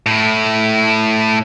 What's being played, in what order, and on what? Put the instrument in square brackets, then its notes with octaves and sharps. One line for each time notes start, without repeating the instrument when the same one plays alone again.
[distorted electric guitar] A2 E4